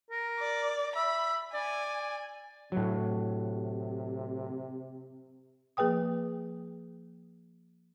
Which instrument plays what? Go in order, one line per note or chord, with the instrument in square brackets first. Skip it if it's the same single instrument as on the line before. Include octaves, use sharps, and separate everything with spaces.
[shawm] A#4
[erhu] D5
[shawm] E5 [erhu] B5
[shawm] D5 [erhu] G#5
[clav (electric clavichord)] A2 F#3 [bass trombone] C3
[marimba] F3 A#3 G#4 B4 G5 D#6